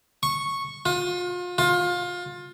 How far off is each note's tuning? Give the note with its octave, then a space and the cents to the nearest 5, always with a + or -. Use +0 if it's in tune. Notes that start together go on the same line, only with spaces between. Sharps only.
C#6 -10
F4 +35
F4 +25